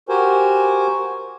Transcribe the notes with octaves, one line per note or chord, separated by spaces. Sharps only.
F#4 G4 A#4 C5 G#5